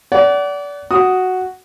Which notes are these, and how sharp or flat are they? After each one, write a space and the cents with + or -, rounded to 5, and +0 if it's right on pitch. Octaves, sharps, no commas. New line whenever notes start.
D5 -30 F#5 +25
F#4 +0 D#6 +0